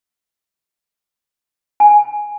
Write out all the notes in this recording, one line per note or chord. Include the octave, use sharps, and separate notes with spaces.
G#5